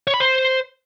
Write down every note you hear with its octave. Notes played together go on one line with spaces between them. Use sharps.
C#5
B5
C5